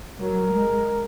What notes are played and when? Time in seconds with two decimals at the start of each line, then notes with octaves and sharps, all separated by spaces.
0.20 F#3 A#4
0.53 G#3